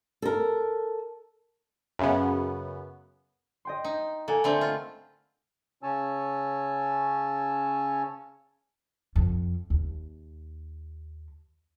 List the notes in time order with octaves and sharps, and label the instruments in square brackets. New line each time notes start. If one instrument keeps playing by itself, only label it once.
[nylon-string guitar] A4 A#4
[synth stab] F#2 C#3 B3
[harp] D#5 G5 C6
[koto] D#4
[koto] A#3 [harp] A4 F#5 G#5
[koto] D3 A3 C4 [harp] B5
[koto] F4
[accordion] C#3 C#4 C#5 G#5 A5 E6
[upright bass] F2
D#2